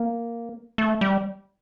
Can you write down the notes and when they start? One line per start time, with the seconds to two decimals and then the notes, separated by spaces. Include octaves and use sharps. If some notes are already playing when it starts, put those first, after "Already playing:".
Already playing: A#3
0.78 A3
1.01 G3